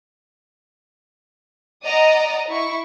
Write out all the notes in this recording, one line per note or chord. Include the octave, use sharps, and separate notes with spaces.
D5 D#5 F#5 A#5 D#6
E4 C#6